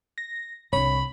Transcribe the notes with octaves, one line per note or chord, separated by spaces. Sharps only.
A#6
C2 D4 C#5 B5